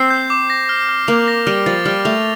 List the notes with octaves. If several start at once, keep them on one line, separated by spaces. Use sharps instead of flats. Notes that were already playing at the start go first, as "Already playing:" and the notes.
Already playing: C4 C7
G6
D6
A#6
F6
F6
A#3 F7
A#6
G3 F6
F3 A6
G3 F6
A3 F7